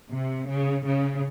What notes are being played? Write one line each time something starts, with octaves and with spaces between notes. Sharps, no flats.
C3
C#3
C#3